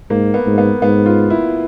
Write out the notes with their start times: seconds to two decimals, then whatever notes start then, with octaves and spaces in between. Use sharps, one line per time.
0.10 G#2 A#3
0.34 B3
0.47 G#2
0.58 B3
0.82 G#2 B3
1.06 F4
1.30 E4